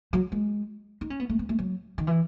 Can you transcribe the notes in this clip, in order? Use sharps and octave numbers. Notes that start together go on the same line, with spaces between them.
F#3
G#3
D#4
C#4
B3
A3
B3
A3
F#3
D#3
E3